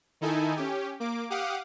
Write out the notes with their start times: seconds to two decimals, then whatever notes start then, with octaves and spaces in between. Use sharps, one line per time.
0.21 D#3 D#4 E4 A4 G#5
0.56 C#4 G4
1.00 A#3 D6
1.30 G4 F5 F#5 D6 D#6